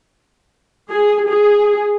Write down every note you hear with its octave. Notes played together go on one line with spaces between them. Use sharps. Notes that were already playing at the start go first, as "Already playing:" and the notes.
G#4
G#4